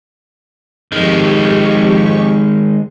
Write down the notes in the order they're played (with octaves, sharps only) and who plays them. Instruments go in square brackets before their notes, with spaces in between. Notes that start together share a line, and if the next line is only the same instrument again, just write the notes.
[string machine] F2 G4 C#6 [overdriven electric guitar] D#3 G#3